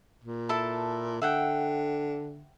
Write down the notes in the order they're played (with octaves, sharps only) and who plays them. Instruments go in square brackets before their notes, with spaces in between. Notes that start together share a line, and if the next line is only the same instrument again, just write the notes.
[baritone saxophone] A#2
[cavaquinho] E4 A4 A5
[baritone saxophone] D3 [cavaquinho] E5 F#5 G5